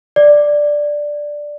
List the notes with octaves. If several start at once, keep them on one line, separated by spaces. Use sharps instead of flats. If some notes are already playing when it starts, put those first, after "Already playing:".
D5